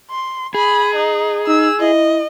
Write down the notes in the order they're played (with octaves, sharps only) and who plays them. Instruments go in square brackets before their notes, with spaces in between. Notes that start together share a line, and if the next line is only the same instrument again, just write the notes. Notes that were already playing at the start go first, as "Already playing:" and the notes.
[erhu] C6
[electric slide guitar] G#4 [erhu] B5
[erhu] D#4
[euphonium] D#4 [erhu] E6
[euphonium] E4 [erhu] D#5